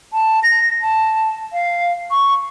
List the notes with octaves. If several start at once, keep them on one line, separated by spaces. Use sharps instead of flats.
A5
A#6
A5
F5
C#6